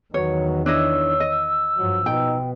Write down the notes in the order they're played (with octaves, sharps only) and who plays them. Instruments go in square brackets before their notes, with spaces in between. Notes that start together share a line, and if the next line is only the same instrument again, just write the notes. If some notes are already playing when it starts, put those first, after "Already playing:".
[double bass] E2 D#3 [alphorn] F#3 [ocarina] B4 [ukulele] C#5
[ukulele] D4 E4 D#5 [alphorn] C#5 [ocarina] E6
[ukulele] D#5
[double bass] G2 F3 [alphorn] F#3
[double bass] B2 [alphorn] D#4 [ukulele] G5